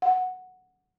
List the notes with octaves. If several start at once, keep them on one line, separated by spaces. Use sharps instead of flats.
F#5